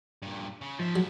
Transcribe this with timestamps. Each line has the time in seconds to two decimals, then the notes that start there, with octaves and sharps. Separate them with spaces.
0.22 G2 A#2
0.61 C#3
0.79 G#2 F3 E5
0.96 F#3